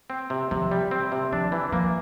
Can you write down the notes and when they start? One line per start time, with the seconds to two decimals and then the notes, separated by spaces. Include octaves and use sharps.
0.10 C4
0.30 C3
0.51 C3 F3
0.71 G3
0.91 C4
1.12 C3
1.32 F3 D4
1.52 E3
1.72 F3 A#3